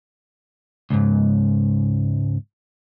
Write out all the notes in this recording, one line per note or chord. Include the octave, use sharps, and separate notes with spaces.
C#2 G#2